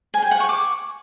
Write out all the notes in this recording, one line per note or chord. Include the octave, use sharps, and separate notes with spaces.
G#5
G5
F#5
C#6
D6